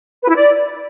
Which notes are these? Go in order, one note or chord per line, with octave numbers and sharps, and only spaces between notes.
B4
E4
D5